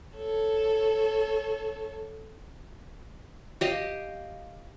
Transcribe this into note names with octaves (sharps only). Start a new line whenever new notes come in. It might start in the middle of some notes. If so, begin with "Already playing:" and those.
A4 C#5
G4 D#5 F5